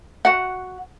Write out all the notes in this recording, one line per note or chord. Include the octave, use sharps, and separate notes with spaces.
F#4 F#5